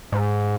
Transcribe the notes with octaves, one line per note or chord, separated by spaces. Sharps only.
G#2